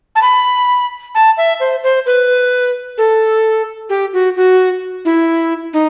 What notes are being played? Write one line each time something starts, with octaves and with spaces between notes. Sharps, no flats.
A5
B5
A5
E5
C5
C5
B4
A4
G4
F#4
F#4
E4
D#4